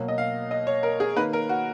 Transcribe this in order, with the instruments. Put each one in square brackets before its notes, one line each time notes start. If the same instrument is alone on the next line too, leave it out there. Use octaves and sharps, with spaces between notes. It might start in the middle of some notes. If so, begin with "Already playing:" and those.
Already playing: [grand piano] B2 F#3 A#3
D#5
F5
D#5
C#5
A#4
G#4
D#3 A#3 B4
A#4
F#4